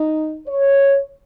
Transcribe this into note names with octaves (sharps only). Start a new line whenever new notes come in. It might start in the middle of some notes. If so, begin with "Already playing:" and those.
Already playing: D#4
C#5